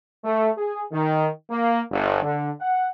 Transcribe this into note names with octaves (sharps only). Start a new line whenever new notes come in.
A3
G#4
D#3
A#3
G1
D3
F#5